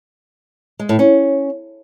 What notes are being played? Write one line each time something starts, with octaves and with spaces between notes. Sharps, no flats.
G#3
A2
C#4